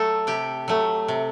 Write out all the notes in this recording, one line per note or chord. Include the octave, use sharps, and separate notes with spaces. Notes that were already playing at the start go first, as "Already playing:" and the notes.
Already playing: F#3 A3 A4
C3 G4
F#3 A3
C3